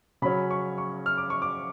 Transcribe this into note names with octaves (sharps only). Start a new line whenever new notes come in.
C#3 F#3 C#4 B5
C#6
C#6
F6
D6
C#6
D6